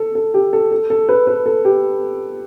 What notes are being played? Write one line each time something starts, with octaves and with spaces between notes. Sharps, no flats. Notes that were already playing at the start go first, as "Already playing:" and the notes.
Already playing: A4
A4
G4
A4
A4
A4
B4
B4
A4
G4